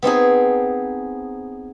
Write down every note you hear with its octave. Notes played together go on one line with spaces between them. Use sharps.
B3 C4 D#4 G#4